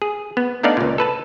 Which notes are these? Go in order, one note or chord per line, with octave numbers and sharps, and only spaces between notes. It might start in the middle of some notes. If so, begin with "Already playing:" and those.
G#4
B3
A3 B3 D4 D#4 D5 F5
C#2 A#2
A4 B4 A5